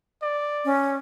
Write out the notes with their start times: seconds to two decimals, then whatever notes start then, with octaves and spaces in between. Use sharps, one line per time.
0.22 D5
0.65 C#4